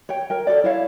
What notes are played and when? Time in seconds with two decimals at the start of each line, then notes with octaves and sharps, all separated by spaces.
0.09 C#5 G5
0.30 A#4 G5
0.47 A4 C#5 D5
0.64 E4 C#5 F5